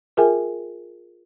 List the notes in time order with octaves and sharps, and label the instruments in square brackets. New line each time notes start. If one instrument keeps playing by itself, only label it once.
[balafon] F4 G#4 A#4 E5 G5 G#5